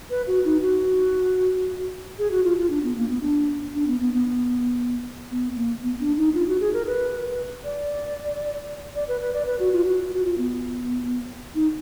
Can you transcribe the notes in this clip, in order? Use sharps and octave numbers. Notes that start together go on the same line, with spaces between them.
B4
F#4
D#4
F#4
G#4
F#4
F4
F4
D4
B3
A#3
B3
D4
D4
B3
B3
B3
B3
A#3
B3
D4
D#4
F4
F#4
G#4
A#4
B4
D5
D5
B4
B4
D5
B4
F#4
F4
F#4
F#4
F4
B3
D#4